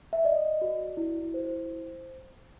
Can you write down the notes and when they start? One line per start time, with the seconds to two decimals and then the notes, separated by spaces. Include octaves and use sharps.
0.13 E5
0.24 D5 D#5
0.62 F#4
0.97 E4
1.34 C5